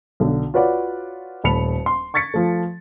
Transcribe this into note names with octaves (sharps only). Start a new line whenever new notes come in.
B1 D3
F4 F#4 B4 C#5 D5 F#5
D#1 A3 A5 B5 C#7 F7
C6
C#6 G#6 A6 B6 C#7
F3 A3